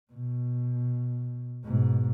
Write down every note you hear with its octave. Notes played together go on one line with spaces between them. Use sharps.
B2
G#2 B2